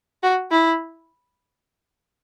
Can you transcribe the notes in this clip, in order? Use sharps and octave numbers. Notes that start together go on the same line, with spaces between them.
F#4
E4